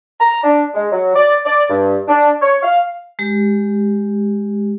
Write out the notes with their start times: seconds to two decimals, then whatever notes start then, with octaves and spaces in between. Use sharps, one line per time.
0.20 A#5
0.43 D4
0.74 G#3
0.92 F#3
1.16 D5
1.45 D5
1.70 G2
2.08 D4
2.42 C#5
2.63 F5
3.19 G#3 G4